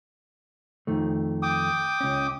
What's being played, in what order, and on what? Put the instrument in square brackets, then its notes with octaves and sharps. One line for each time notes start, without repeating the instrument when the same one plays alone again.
[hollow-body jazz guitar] F2 D#3 A3
[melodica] G5 D6 D#6
[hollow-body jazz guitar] C#2 C#4